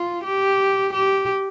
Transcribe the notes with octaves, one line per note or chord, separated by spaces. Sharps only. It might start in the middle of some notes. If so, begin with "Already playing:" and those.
Already playing: F4
G4
G4